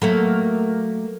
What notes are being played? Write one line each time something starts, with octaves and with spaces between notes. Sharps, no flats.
F#3 A3 A#3